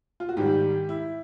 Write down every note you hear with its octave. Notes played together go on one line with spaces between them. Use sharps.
F4
F#4
G#2 D#3 G3 G4
E4